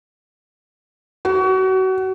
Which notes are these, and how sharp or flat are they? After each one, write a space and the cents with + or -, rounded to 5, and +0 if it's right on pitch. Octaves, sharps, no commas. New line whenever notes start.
F#4 +30